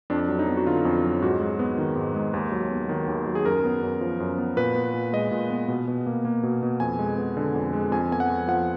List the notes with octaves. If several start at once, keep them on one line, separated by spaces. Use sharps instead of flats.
F2 D4
F#3
D#4
B3
F#4
D3 F4
F2
F#3
G#2 F#4
G#3
B3
D#3
G#2
G#3
D#2
F#3
B3
D#3
D#2
F#3
G#4
F#2 A#4
B3
F#2
F3
F#2
B3
A#2 B4
B3
A#2
G#3 D#5
A#2
B3
B2
B2
A#3
A#3
B2
B2
F2 G#5
G#3
B3
D3
F2
G#3
F2 G#5
B3 G#5
F#5
F2
F3 F#5